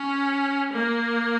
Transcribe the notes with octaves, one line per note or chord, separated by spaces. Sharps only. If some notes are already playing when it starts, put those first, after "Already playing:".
Already playing: C#4
A#3